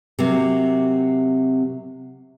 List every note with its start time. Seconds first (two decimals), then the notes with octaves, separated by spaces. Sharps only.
0.19 C3 F#3 A#3